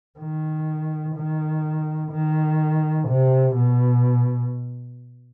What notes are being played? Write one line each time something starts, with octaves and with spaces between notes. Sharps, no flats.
D#3
D#3
D#3
C3
B2